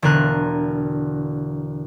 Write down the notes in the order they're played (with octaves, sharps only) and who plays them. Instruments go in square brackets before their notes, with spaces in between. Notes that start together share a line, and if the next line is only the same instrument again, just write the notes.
[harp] E1 D3 A#4 F#6 D#7